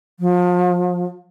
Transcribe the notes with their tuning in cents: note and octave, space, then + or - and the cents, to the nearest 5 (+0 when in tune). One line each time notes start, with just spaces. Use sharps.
F3 +35